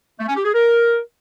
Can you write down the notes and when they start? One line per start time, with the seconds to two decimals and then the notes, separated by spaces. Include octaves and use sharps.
0.19 A3
0.28 C#4
0.36 G4
0.45 G#4
0.54 A#4